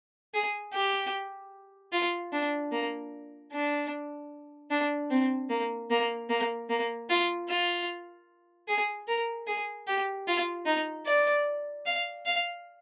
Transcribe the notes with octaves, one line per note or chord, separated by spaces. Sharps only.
G#4
G4
F4
D4
A#3
D4
D4
C4
A#3
A#3
A#3
A#3
F4
F4
G#4
A#4
G#4
G4
F4
D#4
D5
F5
F5